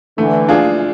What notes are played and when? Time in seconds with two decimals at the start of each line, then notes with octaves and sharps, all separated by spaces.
0.17 D3 E3 A3
0.49 D4 F4 G#4